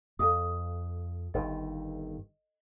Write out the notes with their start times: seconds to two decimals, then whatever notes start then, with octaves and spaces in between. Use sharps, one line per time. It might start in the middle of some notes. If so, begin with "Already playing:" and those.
0.19 F2 A4 F5 D#6
1.34 G1 D#3 D#5